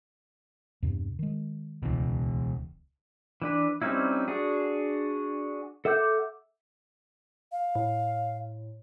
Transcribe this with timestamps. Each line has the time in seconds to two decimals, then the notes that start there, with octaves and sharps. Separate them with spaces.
0.83 E2 G2 C3
1.19 D#3 G#3
1.83 D#1 C#2 B2 E3
3.42 E3 D4 B4
3.82 G3 C4 C#4 D#4 E4
4.28 D4 F#4 G#4
5.85 A4 E5 F#5 D6 G6
7.52 F5
7.75 A2